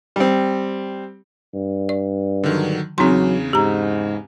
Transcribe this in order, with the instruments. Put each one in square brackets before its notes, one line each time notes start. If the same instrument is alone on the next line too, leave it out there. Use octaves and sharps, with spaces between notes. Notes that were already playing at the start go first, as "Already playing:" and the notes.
[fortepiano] G3 C4
[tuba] G2
[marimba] D5
[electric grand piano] D3 D#3 F#3
[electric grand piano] E2 C#3 [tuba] F#3 [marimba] C4 D#4 C6
[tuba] G#2 [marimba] G4 A#5